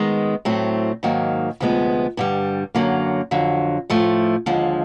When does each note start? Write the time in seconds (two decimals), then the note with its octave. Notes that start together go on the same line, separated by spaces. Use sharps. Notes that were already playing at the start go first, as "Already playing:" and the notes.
Already playing: D#3 G#3 B3
0.45 A2 F#3 A3 C4
1.03 G#2 D#3 F#3 A#3
1.60 D2 C3 F3 G#3 B3
2.17 G2 D3 G3
2.75 F#2 D3 F#3 A#3
3.31 F2 D3 F#3
3.90 A2 F3 A3
4.46 D#2 D3 F3 G#3